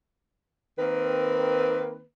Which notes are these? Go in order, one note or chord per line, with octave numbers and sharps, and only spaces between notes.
D#3 A#3 C4 B4